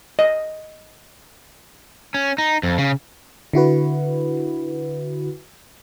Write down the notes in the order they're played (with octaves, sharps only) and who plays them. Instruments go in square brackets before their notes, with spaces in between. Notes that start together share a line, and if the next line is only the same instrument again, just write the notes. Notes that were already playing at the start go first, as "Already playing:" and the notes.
[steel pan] D#5
[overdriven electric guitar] C#4
D#4
F2
C#3
[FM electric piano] D3 E4 F#4 B4